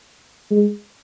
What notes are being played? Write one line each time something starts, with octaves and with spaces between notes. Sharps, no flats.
G#3